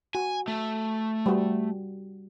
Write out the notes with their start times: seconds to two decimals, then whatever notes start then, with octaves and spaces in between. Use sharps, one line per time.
0.15 F#4 G#5
0.48 A3
1.26 G3 F#4